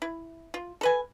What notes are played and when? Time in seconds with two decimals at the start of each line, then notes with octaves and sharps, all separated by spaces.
0.02 E4
0.54 F4
0.81 A4 B4 G#5